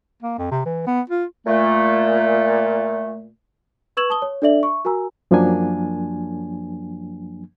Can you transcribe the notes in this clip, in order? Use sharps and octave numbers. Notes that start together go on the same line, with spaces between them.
A#3
F2
C3
E3
B3
F4
A#2 A3
B4 C#6 E6 G#6 E7 F#7
A5 D#6 G7
C#5
D4 A4 D5 E5 F#7
E5 C#6
F#4 A#4 G#5 A#5 E6
F#2 F3 F#3 A#3 D4 G#5